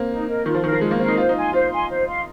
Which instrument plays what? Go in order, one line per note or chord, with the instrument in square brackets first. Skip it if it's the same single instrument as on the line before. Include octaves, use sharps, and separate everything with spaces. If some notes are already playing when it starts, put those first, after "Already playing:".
Already playing: [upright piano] A#3 C4
[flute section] D#4
A#4 D#5
[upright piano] D#3 [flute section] F4
[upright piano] F3
[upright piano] D#3 [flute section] A#4 F5
[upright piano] F3
[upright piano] G#3 [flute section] F4
[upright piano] A#3
[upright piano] C4 [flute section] A#4 F5
[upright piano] D#4
[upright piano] F4 [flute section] C5
[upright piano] D#4
[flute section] G#5 C6
[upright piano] F4 [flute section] C5
[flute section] G#5 C6
C5
F5 C6